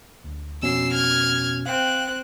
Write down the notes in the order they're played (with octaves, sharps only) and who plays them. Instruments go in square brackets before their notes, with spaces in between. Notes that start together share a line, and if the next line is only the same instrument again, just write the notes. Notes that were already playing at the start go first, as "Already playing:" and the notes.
[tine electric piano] D2
[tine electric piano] F2 B2 C#4 [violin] E6 C7
[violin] F6 G#6
[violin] C4 F#6 [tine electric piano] F5 G5